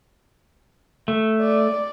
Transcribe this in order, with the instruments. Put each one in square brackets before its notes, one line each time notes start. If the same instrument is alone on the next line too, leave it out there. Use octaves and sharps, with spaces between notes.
[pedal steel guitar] A3
[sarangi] D5